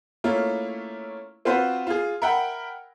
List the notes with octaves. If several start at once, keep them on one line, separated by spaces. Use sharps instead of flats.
A3 A#3 C#4 E4 F4
C4 F4 F#4 B4 C5
F4 G#4
A#4 E5 F#5 G5 B5